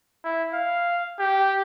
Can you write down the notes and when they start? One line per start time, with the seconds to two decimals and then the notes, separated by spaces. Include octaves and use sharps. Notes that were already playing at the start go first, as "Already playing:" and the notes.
0.24 E4
0.53 F5
1.19 G4